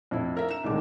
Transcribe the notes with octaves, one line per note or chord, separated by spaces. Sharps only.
F2 A2 E4
A#4 E5
A#5 E7
C2 A2 D3 D#3 G#3 D6